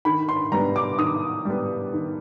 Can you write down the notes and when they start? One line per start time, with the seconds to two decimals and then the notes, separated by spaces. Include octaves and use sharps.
0.05 D#3 B5
0.29 C6
0.52 G3 B3 A#5
0.76 D6
0.98 D#3 D#6
1.45 G3 B3
1.93 D#3